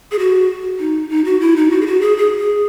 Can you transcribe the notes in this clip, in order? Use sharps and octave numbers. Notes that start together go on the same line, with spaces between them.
G#4
F#4
D#4
D#4
F#4
E4
D#4
F#4
G#4
F#4
G#4
G#4
G#4